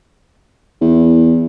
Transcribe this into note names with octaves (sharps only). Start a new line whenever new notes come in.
E2